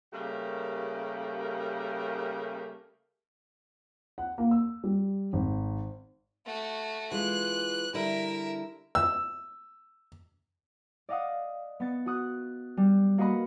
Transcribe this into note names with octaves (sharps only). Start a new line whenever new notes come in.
C#3 G3 A3 A#3 G4 A#4
F#5
A#3
E6
G3
G#1
A3 F#4
E3 G#3 F4 F#6
D3 G3 E4 A#4 E5
E6
D5 D#5 F5 F#5 D#6
B3 A6 C#7
F#4 D#6 F#6
G3
A#3 F#4 B4 D#5 B5 C#7